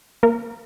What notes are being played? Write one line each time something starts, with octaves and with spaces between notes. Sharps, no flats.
A#3 A#4